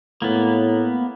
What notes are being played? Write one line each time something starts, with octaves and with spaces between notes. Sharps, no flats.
A2 A#3 B3